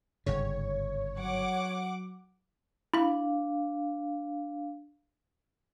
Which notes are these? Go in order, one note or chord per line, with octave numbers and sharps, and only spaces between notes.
G1 G#2 C#3 C#5
F#3 F#5 D6
D4 E4 F5 B5